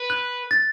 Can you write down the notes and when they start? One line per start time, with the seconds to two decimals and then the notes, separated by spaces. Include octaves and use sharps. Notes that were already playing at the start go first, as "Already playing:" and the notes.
Already playing: B4
0.10 F#6
0.51 A6